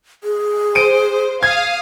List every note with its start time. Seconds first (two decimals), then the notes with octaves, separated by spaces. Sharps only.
0.24 G#4
0.75 C5 D7 D#7
1.43 F5 D#6 G#6